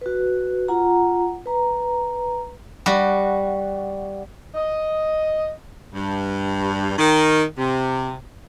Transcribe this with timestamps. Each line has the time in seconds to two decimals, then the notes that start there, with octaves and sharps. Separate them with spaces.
0.01 F#4 B4
0.68 F4 F#5 A#5
1.46 B4 A#5
2.86 G3 F#4
4.55 D#5
5.93 G2
6.97 D#3
7.57 C3